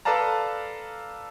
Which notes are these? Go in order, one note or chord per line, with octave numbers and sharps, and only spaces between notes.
A4 B4 D5 F5 A5 A#5